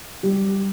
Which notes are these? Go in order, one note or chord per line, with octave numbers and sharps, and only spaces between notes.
G3 G4